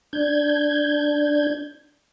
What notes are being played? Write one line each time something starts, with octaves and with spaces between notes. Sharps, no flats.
D4 G6 G#6